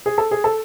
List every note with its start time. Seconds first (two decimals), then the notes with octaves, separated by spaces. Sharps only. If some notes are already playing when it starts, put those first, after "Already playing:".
0.06 G#4
0.18 A4
0.31 G#4
0.44 A4